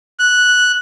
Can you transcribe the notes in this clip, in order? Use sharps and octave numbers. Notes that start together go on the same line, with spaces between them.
F#6